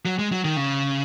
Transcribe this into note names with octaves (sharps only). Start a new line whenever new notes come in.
F#3
G#3
F#3
D#3
C#3